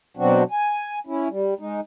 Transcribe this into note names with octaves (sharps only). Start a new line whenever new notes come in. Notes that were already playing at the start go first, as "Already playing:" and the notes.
B2 F#3 C4 D4 F#4
G#5
C#4 E4
G3
G#3 D#4